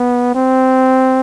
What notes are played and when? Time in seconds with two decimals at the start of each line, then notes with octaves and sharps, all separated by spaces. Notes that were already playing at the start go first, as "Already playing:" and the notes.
Already playing: B3
0.35 C4